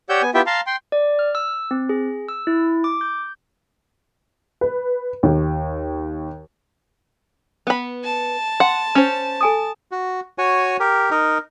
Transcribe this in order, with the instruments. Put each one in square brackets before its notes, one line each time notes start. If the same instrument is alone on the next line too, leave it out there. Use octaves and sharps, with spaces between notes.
[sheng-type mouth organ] G4 C#5 D5 F#5 E6 G6
B3 G#5
B3 E4 F4 G4 E5 G5
F5 A5 A#5 C6
G5 C6
[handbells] D5
F6
E6
C4
G#4
E6
E4
D6
G6
[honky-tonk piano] B4
D#2
[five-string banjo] B3 B5
[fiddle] A5
[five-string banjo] F#5 [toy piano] C6
[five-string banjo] C#4 C5
[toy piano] A4 G#5 D#6
[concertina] F#4
F#4 C#5 G#5
G4 A#4
D#4 A#4